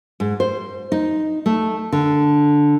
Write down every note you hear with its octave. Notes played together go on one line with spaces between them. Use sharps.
G#2
C5
D#4
A3
D3